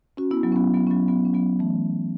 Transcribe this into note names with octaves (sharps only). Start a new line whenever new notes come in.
C#4 F#4
B3 E4
F#3 B3
C#4
F#3 B3
F#3 B3
C#4
F#3 B3
F#3 B3
C#4
F#3 B3
E3 A3